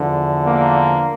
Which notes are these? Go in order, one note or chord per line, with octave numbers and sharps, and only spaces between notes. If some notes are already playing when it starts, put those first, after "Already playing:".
Already playing: E2 D3 F3
A#3